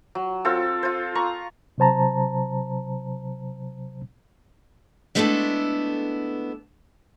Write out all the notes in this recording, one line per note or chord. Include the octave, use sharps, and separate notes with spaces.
F#3
C4 F4 A4
F4 C5
A#5 C#6
C3 F#3 C5 A5 A#5
G#3 A3 B3 D4 E4 A4